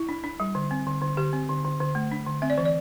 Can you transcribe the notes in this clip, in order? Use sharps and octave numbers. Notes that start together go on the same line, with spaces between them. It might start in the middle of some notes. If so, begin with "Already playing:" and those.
Already playing: E4
D4
D4
G3
D3
C4
D3
D3
D3 G4
C4
D3
D3
D3
A3
D4
D3
C4 E5
D5
E3 C5
D5